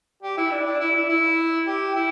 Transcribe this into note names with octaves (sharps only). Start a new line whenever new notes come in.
G4
E4
D4
D4
E4
E4
E4
G4
E4